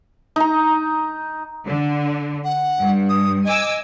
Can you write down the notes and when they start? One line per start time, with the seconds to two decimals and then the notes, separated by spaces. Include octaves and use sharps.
0.36 D#4 A#5
1.66 D3
2.44 F#5
2.79 G2
3.09 D#6
3.45 D#5 G#5 D6 E6